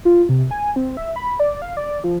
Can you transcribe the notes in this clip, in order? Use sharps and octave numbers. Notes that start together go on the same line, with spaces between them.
F4
C3
G#5
C4
E5
B5
D5
F5
D5
F3